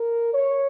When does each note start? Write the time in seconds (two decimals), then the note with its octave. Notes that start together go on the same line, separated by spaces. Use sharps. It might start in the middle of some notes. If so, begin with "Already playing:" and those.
Already playing: A#4
0.34 C#5